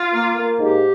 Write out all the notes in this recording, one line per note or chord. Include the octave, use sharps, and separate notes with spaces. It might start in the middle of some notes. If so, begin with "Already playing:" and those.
Already playing: F4
A#3
A#3
G#2 G4